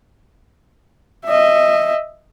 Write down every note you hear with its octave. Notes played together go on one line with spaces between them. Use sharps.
D#5 E5